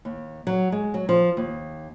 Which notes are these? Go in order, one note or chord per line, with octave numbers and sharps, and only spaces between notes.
D#2
F#3
G#3
F#3
F3
D#2